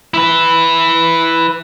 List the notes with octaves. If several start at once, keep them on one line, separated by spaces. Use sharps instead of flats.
E4 B4